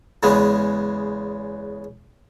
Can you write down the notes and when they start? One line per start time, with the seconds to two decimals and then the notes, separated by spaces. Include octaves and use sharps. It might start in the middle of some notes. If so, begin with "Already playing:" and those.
0.23 E2 C#3 G#3 B3